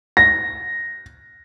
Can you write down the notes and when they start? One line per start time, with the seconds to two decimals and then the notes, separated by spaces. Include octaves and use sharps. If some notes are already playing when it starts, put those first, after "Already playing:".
0.17 A#6